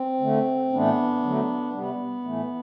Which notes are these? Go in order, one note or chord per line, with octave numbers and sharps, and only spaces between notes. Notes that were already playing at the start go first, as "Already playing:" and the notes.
Already playing: C4
D3 A3
A2 E3 A3 B3 D4
D3 F#3 A3
C3 G3 B3
A2 E3 A3